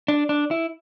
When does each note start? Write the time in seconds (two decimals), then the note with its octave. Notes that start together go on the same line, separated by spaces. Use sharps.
0.08 D4
0.29 D4
0.51 E4